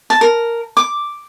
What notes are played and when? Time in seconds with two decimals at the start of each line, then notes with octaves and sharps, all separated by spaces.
0.10 A5
0.21 A#4
0.77 D6